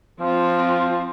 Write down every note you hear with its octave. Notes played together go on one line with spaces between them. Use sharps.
F3 C4 F4